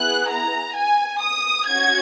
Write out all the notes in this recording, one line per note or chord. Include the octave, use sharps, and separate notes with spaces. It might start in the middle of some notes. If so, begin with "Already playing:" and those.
Already playing: B3 E4 G#4 F#6
A#5
G#5
D#6
C#4 F#4 G#6